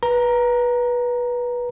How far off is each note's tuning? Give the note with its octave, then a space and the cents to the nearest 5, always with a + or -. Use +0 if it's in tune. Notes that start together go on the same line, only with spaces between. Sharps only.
B4 -20 A#5 +5